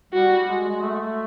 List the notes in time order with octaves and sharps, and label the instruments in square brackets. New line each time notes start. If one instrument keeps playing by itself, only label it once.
[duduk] G3 [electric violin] F#4
[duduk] G#3
G#3
A3